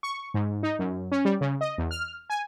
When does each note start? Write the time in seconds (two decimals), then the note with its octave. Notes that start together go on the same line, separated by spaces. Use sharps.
0.03 C#6
0.34 G#2
0.63 D#4
0.79 F#2
1.12 C#4
1.25 G3
1.41 C#3
1.61 D#5
1.78 E2
1.91 F6
2.30 G#5